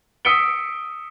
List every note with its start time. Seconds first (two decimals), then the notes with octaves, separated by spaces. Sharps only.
0.25 D#6 E6 B6 C#7 D7 G7